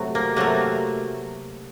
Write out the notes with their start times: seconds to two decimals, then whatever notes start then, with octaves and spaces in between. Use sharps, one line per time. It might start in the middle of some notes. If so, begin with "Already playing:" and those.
Already playing: C3 F#3 A3
0.15 A#3
0.36 C3 F#3 A3 A#3